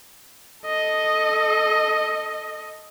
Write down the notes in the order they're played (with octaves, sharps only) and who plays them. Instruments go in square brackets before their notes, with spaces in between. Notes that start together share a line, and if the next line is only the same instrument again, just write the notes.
[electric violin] A4 D#5